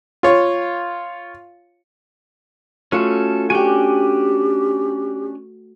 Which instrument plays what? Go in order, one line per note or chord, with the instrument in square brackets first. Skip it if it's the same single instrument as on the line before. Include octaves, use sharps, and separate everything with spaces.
[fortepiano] F4 C#5
[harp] A3 F4 F#4 [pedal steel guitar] C#4 A4
[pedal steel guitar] C#4 D4 G#5 [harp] F#4 G5 [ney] G4